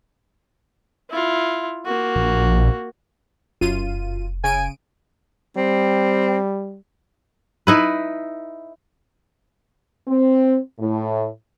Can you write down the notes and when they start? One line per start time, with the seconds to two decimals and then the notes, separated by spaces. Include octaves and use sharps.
1.10 E4 F4
1.85 A#3 F#4
2.16 A#1
3.61 F1 F#2 F4 D#7
4.44 C#3 G#5 D7 D#7
5.57 G3 C4
7.67 D#4 E4 B4
10.08 C4
10.79 A2